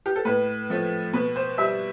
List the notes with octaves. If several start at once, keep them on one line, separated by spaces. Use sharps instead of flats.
G4
A4
A2 B4
F3 A3
B2 B4
C5
G3 E5